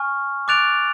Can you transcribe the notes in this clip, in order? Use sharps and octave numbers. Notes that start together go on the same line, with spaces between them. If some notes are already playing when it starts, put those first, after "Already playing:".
Already playing: G#5 C#6 F6
D6 F#6 A6 D7 F7